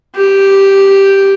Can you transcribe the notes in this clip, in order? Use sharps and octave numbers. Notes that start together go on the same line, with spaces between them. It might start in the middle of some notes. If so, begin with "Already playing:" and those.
G4